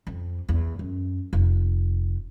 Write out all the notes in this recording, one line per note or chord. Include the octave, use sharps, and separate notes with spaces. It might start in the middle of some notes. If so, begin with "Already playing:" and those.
F2
E2
F#2
F1